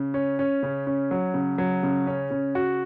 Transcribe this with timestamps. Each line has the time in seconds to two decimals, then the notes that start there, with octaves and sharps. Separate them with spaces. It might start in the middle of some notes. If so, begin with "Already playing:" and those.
Already playing: C#3
0.14 C#4
0.39 C#4
0.63 C#3
0.87 C#4
1.11 F#3
1.34 C#3
1.58 F#3
1.83 C#3
2.07 C#4
2.31 C#3
2.55 F#4